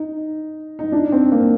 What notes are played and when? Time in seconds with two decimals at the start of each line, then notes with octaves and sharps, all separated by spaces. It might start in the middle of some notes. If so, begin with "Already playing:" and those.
Already playing: D#4
0.79 D#4
0.92 D4
1.12 C4
1.32 A#3